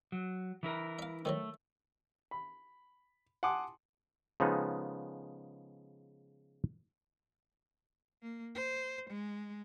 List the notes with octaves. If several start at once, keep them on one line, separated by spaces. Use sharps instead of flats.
F#3
E3 E4 A#4
E5 F5
D#3 F3 F#3 A3
B5
F#5 G#5 A5 C6 D6 D#6
C#3 F3 G#3 B3 D#4 A4
A#3
C5
G#3